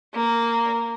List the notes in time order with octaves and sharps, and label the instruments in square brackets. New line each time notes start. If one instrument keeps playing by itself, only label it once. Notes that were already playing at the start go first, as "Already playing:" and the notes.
[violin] A#3